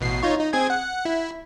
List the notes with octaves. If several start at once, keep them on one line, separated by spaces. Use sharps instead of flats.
A1 B2 C7
D#4 F4 C#5
D#4
C4 G#4 G#6
F#5
E4